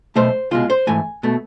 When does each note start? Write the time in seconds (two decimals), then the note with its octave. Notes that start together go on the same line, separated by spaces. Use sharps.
0.16 B1 B2 A3 C5
0.51 C2 B2 G#3 F4
0.70 C5
0.87 G#2 E3 A3 G#5
1.23 B2 A3